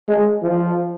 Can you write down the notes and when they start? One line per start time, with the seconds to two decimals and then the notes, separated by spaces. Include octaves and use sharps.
0.08 G#3
0.42 F3